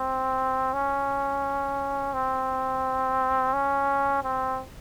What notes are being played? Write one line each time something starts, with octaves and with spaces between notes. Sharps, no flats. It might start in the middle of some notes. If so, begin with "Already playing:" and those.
Already playing: C4
C#4
C4
C#4
C4